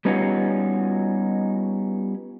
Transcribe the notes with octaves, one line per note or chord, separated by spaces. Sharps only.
G3 B3 C#4 D#4 F4 F#4